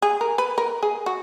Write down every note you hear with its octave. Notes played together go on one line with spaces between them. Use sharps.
G#4
A#4
B4
A#4
G#4
F#4